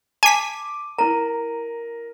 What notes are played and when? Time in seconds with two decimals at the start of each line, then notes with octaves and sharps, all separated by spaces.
0.23 G#5 A5 D6 B6 D#7
0.98 E4 A#4 A#5 D#7